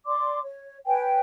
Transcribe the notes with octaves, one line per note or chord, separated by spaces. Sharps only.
D5 C6 D6
C#5
B4 C#5 G5 G#5